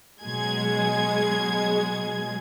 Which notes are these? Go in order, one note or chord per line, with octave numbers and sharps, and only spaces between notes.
B2 F#3 G#3 G#4 G#6